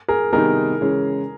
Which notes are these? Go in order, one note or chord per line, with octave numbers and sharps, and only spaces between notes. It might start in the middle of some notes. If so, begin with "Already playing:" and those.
G#4 A#4
C3 D#3 G3 B3 D#4 G#4 A#4
C#3 E3 G#3 C#4